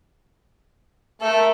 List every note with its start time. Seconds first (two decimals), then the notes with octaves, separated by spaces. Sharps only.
1.21 A3 A4 A#4